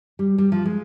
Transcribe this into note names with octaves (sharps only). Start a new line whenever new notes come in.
G3
G3
F3
G#3